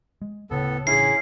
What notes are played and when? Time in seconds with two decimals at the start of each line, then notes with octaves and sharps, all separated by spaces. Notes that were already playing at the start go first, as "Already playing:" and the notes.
0.22 G#3
0.51 D1 A2 C#3 B3 A4
0.87 A1 C#3 C#4 D4 E4 G#4 C7